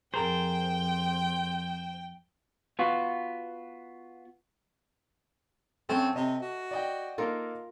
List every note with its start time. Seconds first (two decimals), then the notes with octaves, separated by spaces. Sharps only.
0.14 F2 G#4 A#4 C5 G5
2.79 B3 F4 F#4
5.89 F#2 A3 C4
6.16 C3 D#5
6.42 F#4
6.71 D5 D#5 G5
7.18 A#3 D#4 F4 A4 A#4